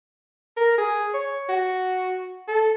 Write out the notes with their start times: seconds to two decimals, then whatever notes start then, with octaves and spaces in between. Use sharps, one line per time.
0.57 A#4
0.78 G#4
1.14 C#5
1.49 F#4
2.48 A4